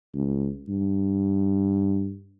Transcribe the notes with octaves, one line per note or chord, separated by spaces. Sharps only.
C#2
G2